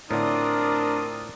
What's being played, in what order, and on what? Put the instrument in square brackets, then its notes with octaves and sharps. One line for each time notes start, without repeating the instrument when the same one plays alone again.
[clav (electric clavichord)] A2 D3 [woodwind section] C4 F4 D#6 [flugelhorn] D4 [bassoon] A#4